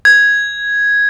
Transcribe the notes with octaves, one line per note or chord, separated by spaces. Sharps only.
G#6